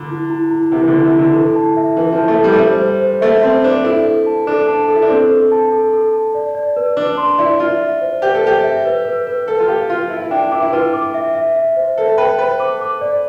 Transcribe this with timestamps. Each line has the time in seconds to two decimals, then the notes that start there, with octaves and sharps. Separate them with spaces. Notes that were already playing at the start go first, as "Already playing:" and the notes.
Already playing: D3 F4
0.10 E4
0.30 E4
0.51 E4
0.71 C3 E4
0.81 E3
0.88 D3 E4
1.02 C3
1.14 E4
1.19 D3
1.34 E3 A4
1.56 A5
1.77 E5
1.97 E3 E5
2.12 F3
2.18 A5
2.28 A3
2.39 A4
2.44 G3
2.53 A3
2.59 G3 C5
2.80 C5
3.01 C5
3.21 A3 E5
3.42 C4 E5
3.64 D4 C5
3.84 E4 A4
4.05 A4
4.26 A5
4.47 D4 A4
4.68 A5
4.88 A4
4.95 E4
5.02 D4
5.09 C4 A4
5.30 A4
5.52 A5
5.72 A4
5.93 A4
6.13 A5
6.35 D5
6.55 D5
6.77 B4
6.97 D4 B4
7.17 C6
7.38 E4 D5
7.60 F4 E5
7.80 E5
8.01 C5
8.22 G4 C5
8.35 A4
8.43 G4 C5
8.64 E5
8.85 B4
9.05 B4
9.27 B4
9.47 A4 B4
9.60 F4
9.68 G4 F5
9.89 F4 F5
10.10 E4 E5
10.21 E4
10.31 D4 G5
10.52 E4 D6
10.62 E4
10.72 F4 B4
10.93 D6
11.14 E5
11.35 E5
11.56 E5
11.76 C5
11.98 A4 E5
12.18 B4 G5
12.39 B4 C5
12.60 D6
12.81 D6
13.01 D5